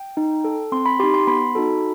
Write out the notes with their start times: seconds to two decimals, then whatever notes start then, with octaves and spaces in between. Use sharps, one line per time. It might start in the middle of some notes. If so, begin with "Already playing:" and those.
Already playing: G5
0.17 D#4
0.44 A4
0.72 C4 C6
0.86 B5
1.00 D#4 G4 C6
1.14 C6
1.27 B3 B5
1.55 D#4 F#4 A4